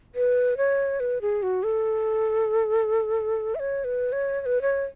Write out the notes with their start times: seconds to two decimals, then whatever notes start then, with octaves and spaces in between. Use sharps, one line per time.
0.15 B4
0.57 C#5
1.00 B4
1.21 G#4
1.43 F#4
1.63 A4
3.55 E5
3.60 C#5
3.84 B4
4.12 C#5
4.42 C#5
4.46 B4
4.62 C#5